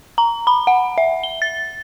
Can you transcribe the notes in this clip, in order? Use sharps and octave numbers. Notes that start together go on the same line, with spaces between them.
A#5
B5
F#5
E5
G7
A6